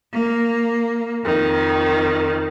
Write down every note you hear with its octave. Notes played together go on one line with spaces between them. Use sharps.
A#3
F2 D#3